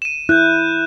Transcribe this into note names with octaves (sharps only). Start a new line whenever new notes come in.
D#7 E7
E4 F#6 G6